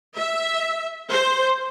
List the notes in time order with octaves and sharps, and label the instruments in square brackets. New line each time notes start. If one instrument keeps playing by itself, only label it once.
[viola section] E5
C5